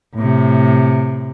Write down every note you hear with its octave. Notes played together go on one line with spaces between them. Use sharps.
A2 C3